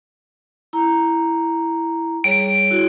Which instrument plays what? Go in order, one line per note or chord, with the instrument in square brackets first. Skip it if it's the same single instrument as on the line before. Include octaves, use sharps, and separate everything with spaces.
[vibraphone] E4 A#5
[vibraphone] G3 G#4 C#5 [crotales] D7
[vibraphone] E4 F#4